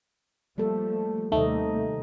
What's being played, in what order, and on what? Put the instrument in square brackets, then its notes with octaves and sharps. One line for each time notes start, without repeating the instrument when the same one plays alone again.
[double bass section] F3 A3 [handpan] G3 A#3 A4
[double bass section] D#2 C3 G3 [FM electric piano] A3 [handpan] D#4 C5 D#5